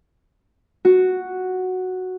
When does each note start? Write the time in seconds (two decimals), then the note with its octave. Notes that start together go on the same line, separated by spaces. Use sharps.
0.85 F#4